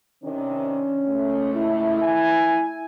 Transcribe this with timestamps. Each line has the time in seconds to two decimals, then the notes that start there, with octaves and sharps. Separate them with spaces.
0.24 C3 D#3 C#4 D4
1.07 C#2 A3
1.55 E4
2.02 G#5